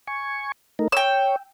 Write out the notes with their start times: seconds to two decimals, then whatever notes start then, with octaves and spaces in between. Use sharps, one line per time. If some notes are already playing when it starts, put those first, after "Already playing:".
0.07 G#5 C#6
0.79 A3 D#4 A#4
0.92 C#5 G5 E6